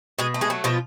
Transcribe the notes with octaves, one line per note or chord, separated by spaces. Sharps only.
B2 G#3 G#4
A3
G#3 G#4
F#3
B2 F3 F4